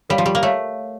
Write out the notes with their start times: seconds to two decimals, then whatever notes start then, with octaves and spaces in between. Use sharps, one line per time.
0.10 G3 A#4 C#5 F5
0.18 F3
0.26 G3 G4
0.35 A#3
0.42 A3 A#4 C#5 F5